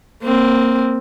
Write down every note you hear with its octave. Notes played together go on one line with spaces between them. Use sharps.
A#3 C4